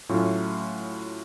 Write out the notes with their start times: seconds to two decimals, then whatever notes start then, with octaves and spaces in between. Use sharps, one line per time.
0.09 A2 F#3 A3 C#4 F4